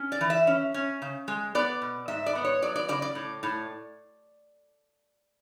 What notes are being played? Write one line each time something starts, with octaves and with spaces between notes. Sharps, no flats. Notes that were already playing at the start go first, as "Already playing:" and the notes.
Already playing: C#4
D5
E3
E5
C#4
C#4
C#3
G#3
B3 D5
B2
G#2 E5
D5
B3
C#5
F#3 D5
D5
C#3 D5
D5
A2
A2